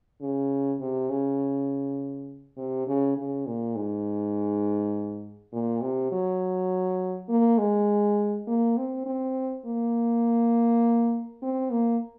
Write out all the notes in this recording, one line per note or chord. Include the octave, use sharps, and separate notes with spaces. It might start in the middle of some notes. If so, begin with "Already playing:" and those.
C#3
C3
C#3
C3
C#3
C#3
A#2
G#2
A#2
C3
F#3
A#3
G#3
A#3
C4
C4
A#3
C4
A#3